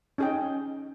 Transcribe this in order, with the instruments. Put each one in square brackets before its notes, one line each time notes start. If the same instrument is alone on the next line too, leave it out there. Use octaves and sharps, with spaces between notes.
[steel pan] C#4 D#4 G#4 D#5 G5